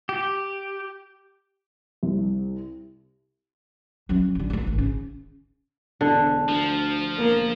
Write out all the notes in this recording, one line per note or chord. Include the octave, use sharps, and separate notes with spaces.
G4
C2
F#3 C#4
A1 D3
F#3 A3
G#1 G2
C#3
E1 D3
D2 F3
E1 A#3